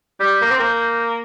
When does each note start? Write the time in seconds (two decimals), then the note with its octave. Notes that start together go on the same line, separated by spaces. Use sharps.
0.20 G3 G6
0.42 A#3
0.51 C4
0.59 A#3